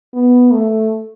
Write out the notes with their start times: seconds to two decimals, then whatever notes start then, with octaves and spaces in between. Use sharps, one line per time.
0.14 B3
0.52 A3